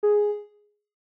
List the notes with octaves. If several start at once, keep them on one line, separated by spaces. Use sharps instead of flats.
G#4